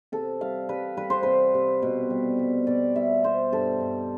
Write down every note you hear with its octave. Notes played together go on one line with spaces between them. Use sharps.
C3 A4
G3 F5
G3 B4
G3 B4
C5
C3 B4
C3
B2
G3
G3
B2 D5
G3 E5
B2 C5
G2 A4
G2